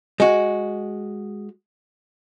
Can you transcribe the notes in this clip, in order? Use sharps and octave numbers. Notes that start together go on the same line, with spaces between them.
G#3 F#4